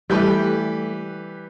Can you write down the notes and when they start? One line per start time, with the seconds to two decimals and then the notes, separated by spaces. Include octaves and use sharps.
0.10 E3 G3 A3 G4 B4 G5